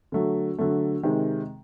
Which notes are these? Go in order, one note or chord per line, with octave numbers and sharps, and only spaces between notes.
D3 F#3 A3
D3 F#3 A3
C3 D#3 G#3